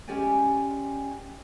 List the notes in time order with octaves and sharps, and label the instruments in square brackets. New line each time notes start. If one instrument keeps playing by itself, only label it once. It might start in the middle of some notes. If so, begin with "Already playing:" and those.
[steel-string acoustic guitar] G#3 C#4 G4 D5 G5 G#5